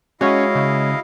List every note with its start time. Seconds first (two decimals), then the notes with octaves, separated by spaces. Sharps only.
0.21 G#3 C#4 E4 F#4 C#5 D#5 F5
0.55 C#3